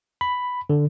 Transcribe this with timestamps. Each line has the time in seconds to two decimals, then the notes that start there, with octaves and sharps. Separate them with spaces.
0.21 B5
0.70 D3